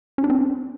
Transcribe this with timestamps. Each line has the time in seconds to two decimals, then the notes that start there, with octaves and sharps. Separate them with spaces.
0.18 C#4
0.24 D4
0.30 C4